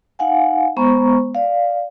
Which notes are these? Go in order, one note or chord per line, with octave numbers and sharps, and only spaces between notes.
D#4 F5 F#5 G#5
G#3 B3 C5 A#5 C#6
D5 F5